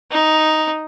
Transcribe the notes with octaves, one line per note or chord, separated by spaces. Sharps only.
D#4